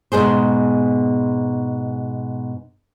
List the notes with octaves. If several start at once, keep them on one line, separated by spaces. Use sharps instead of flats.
G#2 B2 G#4 C5